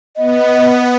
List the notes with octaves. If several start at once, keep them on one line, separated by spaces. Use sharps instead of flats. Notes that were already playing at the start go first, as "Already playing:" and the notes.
B3 D#5